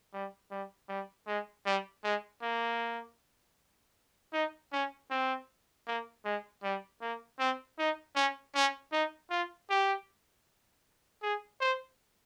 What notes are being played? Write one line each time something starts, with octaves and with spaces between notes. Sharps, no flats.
G3
G3
G3
G#3
G3
G#3
A#3
D#4
C#4
C4
A#3
G#3
G3
A#3
C4
D#4
C#4
C#4
D#4
F4
G4
G#4
C5